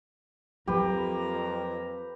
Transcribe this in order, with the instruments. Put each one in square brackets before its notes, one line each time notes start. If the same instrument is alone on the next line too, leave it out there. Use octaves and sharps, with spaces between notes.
[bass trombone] F2 [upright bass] F3 F#3 [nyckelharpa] A#3 A#5 [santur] G4 B4